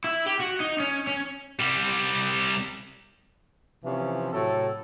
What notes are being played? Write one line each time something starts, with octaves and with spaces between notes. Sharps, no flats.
E4
G4
F#4
D#4
C#4
C#4
C2 G3
C3 E3 F3 C#4
A2 C3 F#3 A4